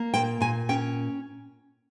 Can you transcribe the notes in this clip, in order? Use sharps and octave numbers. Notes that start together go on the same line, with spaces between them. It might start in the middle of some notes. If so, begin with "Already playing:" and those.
Already playing: A#3
A#2 G5
A#2 G#5
C#4 G5